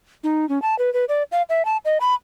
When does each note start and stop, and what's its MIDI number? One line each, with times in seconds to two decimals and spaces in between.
0.24 0.48 63
0.49 0.61 61
0.62 0.78 81
0.79 0.92 71
0.94 1.05 71
1.09 1.23 74
1.32 1.42 77
1.49 1.65 76
1.65 1.77 81
1.85 1.98 75
2.01 2.14 83